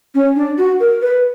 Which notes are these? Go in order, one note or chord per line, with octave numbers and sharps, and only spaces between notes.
C#4
D4
F#4
A#4
B4